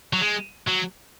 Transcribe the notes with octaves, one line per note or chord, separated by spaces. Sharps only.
F#3
G#3
F#3